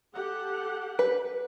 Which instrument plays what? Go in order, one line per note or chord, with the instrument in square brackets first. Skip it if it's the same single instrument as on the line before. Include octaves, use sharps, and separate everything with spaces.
[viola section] G4 A4 F#5
[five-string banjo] B4